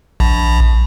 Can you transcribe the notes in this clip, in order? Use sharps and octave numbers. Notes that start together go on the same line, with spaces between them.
A#1